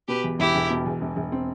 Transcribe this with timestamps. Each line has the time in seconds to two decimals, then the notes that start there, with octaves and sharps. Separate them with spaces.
0.08 B2 G4 B4
0.24 E2
0.39 E1 E4 G4
0.55 E1
0.70 B2
0.86 E2
1.01 E1
1.16 E1
1.32 C4